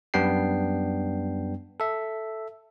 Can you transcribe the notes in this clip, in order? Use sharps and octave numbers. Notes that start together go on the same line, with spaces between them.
F#2 G3 B3 D4 G5 C7
A4 E5